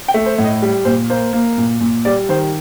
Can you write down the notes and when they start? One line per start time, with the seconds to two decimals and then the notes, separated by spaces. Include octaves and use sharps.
0.08 G5
0.14 A3
0.26 C5
0.38 A2
0.44 D#5
0.62 G3
0.85 A#2 C5
1.10 A#3 C5
1.33 A#3
1.58 A#2
1.81 A#2
2.05 G3 D5
2.29 D#3 C5